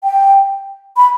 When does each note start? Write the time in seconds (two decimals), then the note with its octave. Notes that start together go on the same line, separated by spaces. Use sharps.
0.03 G5
0.97 B5